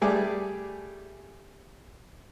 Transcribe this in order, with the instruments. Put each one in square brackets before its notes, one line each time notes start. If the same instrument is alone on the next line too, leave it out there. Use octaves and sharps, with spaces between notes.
[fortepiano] G3 A3 G#4 D5